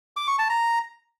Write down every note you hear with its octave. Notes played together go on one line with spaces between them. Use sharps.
D6
C#6
A5
A#5